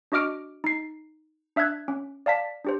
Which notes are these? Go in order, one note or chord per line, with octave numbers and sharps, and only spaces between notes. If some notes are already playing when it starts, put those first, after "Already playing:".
D4 F#4 D#5 D6 F6 D7
D#4 C7
D4 E5 E6 F#6 G#6
C#4
D5 F5 A5 B6
D4 G4 C5